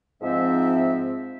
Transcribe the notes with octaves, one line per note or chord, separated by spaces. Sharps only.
G#2 F3 C4 E5